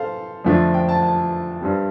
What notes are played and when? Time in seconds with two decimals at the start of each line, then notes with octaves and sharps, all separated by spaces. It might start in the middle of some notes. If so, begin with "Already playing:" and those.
Already playing: A4 C5 F5
0.45 F2 D3 F3 A3 D4
0.74 G5
0.89 A5
1.03 A5
1.61 G2 G3 C4